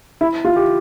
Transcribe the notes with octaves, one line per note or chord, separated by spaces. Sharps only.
E4
F4
G4